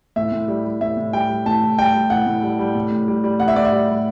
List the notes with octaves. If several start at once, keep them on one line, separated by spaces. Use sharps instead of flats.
A2 E5
A2
G3
G3
A2 E5
A2
G3 G5
G3
A2 A5
A2
G3 G5
G3
A2 F#5
A2
G3
G3
A2
A2
G3
G3
A2 F#5
E5
A2 D5
E5
G3
G3